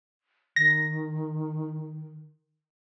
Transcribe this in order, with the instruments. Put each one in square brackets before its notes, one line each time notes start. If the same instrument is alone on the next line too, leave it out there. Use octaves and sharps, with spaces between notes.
[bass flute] D#3 [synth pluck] A#6